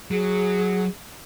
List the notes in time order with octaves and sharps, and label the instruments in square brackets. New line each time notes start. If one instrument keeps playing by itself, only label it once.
[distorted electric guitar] F#3 [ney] G#4